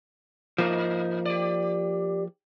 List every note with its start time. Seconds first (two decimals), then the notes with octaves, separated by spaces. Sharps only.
0.58 G#2 F3 A#3 D#4
1.25 G4 D5